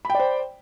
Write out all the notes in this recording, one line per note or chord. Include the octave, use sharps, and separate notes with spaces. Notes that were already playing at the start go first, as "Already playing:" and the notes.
C5 D5 G5 B5